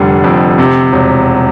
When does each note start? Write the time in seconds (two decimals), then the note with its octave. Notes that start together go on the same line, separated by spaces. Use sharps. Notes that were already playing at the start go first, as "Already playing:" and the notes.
Already playing: F1 D3 G3
0.24 F2
0.58 C3
0.92 E1